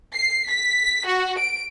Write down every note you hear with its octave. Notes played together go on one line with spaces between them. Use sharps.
C7
B6
F#4
D7